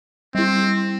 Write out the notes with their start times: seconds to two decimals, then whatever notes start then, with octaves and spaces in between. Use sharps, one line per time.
0.35 G3 C4 E4